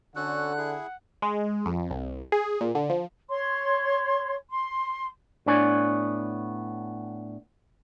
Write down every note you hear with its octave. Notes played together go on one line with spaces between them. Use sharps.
D3 C#4 F#4 A4 F#5 F#6
E4 G#4
G#3
F2
C2
G#4
A#2
D3
F3
C#5 C6
C6
A2 B3 D4 C#5 D5 G#5